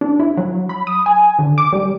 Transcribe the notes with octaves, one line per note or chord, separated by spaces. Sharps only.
D4
E4
F#3
B5
D#6
G#5
D3
D6
G3